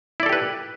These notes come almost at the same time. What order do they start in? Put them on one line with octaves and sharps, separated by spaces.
E4 D5 A4 G4 B4